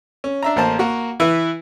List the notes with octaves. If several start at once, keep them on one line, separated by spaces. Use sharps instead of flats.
C#4
D4 E5 A#5
A1 A#3 C5 A5
A#3 F#4
E3 E4 B4